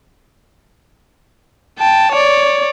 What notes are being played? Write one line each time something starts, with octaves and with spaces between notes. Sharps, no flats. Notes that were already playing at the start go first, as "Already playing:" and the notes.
G5 A5
C#5 D5